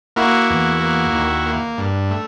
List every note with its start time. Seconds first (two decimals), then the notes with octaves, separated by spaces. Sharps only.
0.16 A#3 E4 F#4
0.50 E2
0.81 A#3
1.13 D#2
1.46 A#3
1.78 G2
2.11 A3